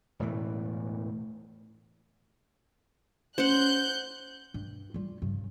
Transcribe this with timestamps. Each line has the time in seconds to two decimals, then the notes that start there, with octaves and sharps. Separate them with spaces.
0.19 E1 A2 E3
3.38 C#4 C5 F#5 F#6 G6
4.54 G2
4.94 G3 F4
5.22 G2 C#3